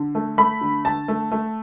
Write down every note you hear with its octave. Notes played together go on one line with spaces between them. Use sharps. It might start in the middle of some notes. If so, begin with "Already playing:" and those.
Already playing: D3
A3
A3 B5
D3
D3 A5
A3
A3